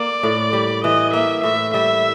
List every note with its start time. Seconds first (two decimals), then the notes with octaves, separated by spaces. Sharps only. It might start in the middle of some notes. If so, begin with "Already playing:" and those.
Already playing: A#3 D5
0.23 A2
0.53 G3
0.84 E3 D#5
1.13 A#3 E5
1.43 A2 E5
1.73 G3 E5